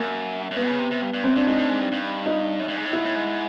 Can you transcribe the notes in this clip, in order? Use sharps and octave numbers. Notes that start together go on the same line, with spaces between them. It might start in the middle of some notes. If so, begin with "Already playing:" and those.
Already playing: F#2 A#3
F#2
G2 B3
C#3
C3
C3
G2
G2
F#2 C4
G2 D4
G#2 D#4
A2
G#2
G2
G2
D#4
F#2
G2
G#2
A2
G#2 E4
A2
G#2